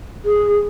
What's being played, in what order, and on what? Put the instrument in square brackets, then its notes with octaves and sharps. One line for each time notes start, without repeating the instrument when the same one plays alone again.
[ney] G#4